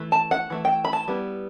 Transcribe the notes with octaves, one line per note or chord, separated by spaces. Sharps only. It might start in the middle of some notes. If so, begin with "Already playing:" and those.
Already playing: E3 A3
A5
F#5
E3 A3 E4
G5
B5
A5
G3 B3 E4